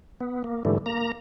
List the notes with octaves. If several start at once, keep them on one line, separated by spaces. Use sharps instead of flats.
B3
A#3
G#2 D3 E3 G3 A3
A#3 A#5